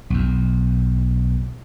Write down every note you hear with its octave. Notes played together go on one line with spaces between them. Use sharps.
B1 E2